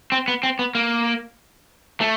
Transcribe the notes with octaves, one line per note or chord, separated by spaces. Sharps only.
C4
B3
C4
B3
A#3
A3